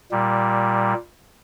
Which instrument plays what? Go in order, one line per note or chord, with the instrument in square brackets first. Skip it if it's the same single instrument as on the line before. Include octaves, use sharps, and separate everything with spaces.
[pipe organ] A#2 G3